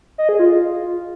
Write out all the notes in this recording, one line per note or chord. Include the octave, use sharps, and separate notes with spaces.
D#5
G#4
F4